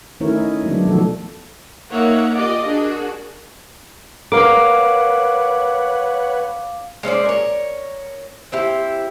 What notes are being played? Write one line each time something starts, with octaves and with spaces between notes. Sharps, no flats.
D#3 A3 C#4 E4 A#4 C#5
D#5
D3 F#3 G#3 B3 D4
B2 D#3 F3 A3 F#4 A4
A#3 D#4 A#4 C#5 E5 F#5
F4 G4 D5 D#5
D4 F#4 G#4 A#4
A#4 B4 C#5 F5 F#5 D6
G#3 C#4 C5 D5
A#4 C#5
C4 E4 G4